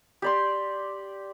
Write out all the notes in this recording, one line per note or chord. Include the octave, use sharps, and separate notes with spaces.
G4 D5 C6